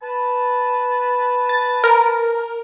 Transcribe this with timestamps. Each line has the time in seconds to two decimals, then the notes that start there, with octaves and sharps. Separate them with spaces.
0.02 B4 A5
1.49 A6
1.84 A#4